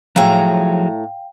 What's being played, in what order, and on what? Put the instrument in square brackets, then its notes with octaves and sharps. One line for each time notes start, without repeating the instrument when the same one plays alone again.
[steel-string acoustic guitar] A2 A#5 [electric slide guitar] F3 F#3 G#4 [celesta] F5 G5